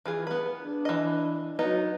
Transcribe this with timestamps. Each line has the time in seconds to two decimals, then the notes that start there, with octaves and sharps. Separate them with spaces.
0.06 E3 F4 G#4
0.27 B3 B4
0.60 D4
0.85 E3 D#5
1.59 F#3 B3 D#4